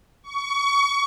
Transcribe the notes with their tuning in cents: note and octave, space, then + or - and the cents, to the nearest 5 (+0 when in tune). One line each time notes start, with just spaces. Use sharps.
C#6 +25